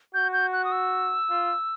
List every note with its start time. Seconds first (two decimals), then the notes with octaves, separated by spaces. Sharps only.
0.14 F#4 G6
0.33 G6
0.53 F#6
0.65 D#6
0.72 E6
1.30 F4